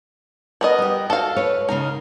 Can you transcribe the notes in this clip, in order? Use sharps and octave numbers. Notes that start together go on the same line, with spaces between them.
B3 A#4 D#5
G3 G4
F#4 A4 F5
B4 C#5
C#3 G#3 D#4 A#4